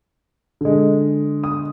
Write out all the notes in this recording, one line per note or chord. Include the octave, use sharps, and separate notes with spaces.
D3 G#3
D#6